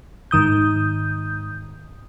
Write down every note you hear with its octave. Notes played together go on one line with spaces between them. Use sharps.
G#2 D#3 D#6 G6